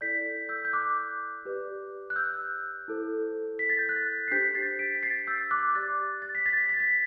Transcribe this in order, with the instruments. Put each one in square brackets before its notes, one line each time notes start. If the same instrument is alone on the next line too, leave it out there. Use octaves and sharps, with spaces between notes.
[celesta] E4 A4 D5 G6 B6
E6 G6
G6
D6 F#6
G4 B4 D5
F#6
E6 G6
E4 A4 C5
B6
A6
G6
F#6 A6
C7
D4 G4 C5 G6 B6
A6 C7
B6 D7
B6
A6 C7
E6 G6
D6 F#6
G4 D5 F#6 A6
A6
B6
A6
B6
A6
B6